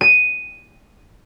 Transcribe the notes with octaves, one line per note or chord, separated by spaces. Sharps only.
D#7